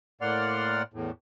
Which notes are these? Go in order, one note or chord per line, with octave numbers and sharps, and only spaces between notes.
A2 A#3 D5 F#5 C6 F6
E2 A2